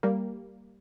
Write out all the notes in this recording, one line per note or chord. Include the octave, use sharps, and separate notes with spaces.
G3 A#3